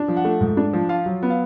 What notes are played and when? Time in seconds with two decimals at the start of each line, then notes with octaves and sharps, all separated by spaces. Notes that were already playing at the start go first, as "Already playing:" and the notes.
Already playing: D4
0.08 F3
0.17 F#5
0.25 A3
0.41 G#2
0.57 D4
0.73 F3
0.89 F4 F5
1.06 F#3
1.23 B3
1.30 F5